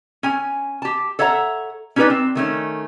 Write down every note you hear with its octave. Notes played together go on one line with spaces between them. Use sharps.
C#4 G#5
G4 A5
A4 C#5 E5 F#5 A#5
C#4 D#4 G4 A#4 B4 D5
C4
D#3 A3 C#4